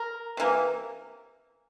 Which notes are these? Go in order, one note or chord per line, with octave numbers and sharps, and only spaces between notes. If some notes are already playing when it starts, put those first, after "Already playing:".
Already playing: A#4
C3 E3 A#3